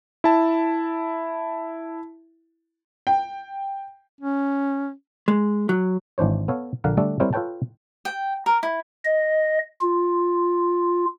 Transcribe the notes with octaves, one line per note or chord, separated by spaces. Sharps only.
E4 A5
G5
C#4
G#3
F#3
G#1 E3 D4 C5 C#5
B3 A4 C#5 F5
A#1 D3 A#3 F5 F#5
D3 G3 A3 D4 A4
G3 C4 E4 A#4 C5 C#5
F4 A4 B4 C#5 G5 A5
G5
A#4
E4
D#5
F4